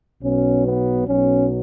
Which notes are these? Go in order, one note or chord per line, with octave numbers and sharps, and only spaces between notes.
B1 B2 F#3 C#4
B3
B1 B2 F#3 C#4